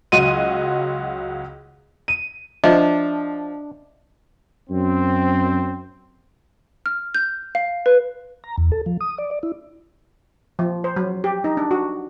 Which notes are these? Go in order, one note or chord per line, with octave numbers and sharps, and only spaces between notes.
C#2 F#3 F#4 D#5 C6 D#7
D#7
F3 D4 D#5 E5 A5
F#2 C4
F6
G6
F5
B4
A#5
E2
A4
F3
D#6
D5
D5
E4
F3
C5
F#3
G4
D#4
D4
F#4